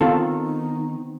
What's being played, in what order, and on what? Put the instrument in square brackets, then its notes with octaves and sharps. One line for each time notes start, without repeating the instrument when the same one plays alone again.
[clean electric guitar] D#3 [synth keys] B3 C4 [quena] D#4 [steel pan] F4 A4